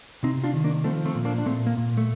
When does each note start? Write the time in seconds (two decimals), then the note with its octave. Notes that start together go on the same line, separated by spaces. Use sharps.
0.23 C3 C4 D#4
0.43 D4 F4
0.53 D#3
0.64 A#3 D4
0.84 F3 A3 C4
1.05 A3 C4
1.15 A#2
1.25 A#3 D4
1.38 D4
1.46 A#2 A3 C4
1.66 A#3
1.77 A#2
1.97 A3